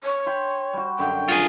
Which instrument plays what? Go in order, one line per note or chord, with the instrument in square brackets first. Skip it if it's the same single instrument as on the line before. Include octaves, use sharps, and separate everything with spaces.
[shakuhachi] C#5
[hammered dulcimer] G5 B5 C6
G3 F#4
[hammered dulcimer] F#2 D3 [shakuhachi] G5
[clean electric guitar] F4 F#4 G#4